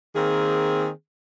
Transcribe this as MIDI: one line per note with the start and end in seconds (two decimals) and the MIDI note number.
0.15 0.88 51
0.15 0.88 58
0.15 0.88 60
0.15 0.88 68